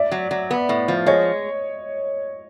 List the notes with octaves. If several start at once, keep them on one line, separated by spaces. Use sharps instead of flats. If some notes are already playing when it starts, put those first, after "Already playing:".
Already playing: D5 E5
F#3
F#3
B3
A2
F3
G#3 C#5 D#5